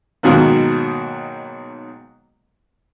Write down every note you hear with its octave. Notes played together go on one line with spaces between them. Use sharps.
G#2 B2 D#3 F#3 A#3